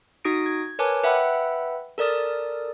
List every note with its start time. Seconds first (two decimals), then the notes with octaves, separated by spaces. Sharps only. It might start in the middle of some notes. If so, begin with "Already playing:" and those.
0.25 D#4 F#4 D#6 A#6 D7
0.46 G#6
0.79 A#4 B4 C#5 G#5 A5 D6
1.03 B4 E5 F#5 G5 B5 E6
1.98 A4 A#4 D5 D#6 A6